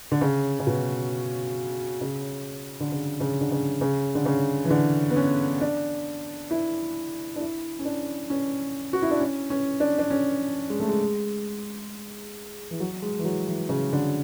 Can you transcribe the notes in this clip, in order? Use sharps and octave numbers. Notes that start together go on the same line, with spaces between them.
D3
C#3
C#3
B2
C#3
D3
C#3
C#3
D3
C#3
C#3
D3
C#3
E3
D3
B3
C#4
D4
E4
D4
E4
C#4
D4
C#4
F#4
E4
D4
C#4
C#4
D4
D4
C#4
G#3
A3
G#3
E3
F#3
G#3
E3
F#3
E3
C#3
D3